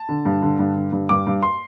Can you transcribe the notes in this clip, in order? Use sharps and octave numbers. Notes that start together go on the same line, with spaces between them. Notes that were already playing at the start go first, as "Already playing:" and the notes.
Already playing: A5
D3
G2
D3
G2
D3
G2
G2 D6
G2
C6